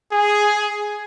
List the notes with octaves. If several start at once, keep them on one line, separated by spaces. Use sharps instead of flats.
G#4